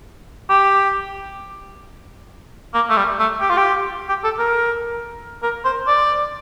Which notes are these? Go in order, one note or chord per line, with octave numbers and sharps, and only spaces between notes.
G4
A#3
A3
G3
A3
G4
F4
G4
G4
A4
A#4
A#4
C5
D5